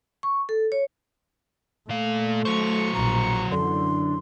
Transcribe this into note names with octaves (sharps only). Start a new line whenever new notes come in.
C#6
A4
C#5
A#2 A3 F5
F#3 C5 C#6
A#1 B2 A#5
F#2 D3 E3 C6